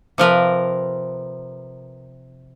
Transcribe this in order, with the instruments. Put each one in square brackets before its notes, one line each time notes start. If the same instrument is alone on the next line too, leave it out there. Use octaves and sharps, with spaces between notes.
[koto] C3 F3 A#4 B4